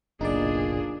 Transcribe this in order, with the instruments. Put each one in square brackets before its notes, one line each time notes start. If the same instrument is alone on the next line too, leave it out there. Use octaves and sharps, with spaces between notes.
[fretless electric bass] F#1 B1 [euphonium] A#2 [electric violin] D4 G#4 [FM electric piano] D#4 D5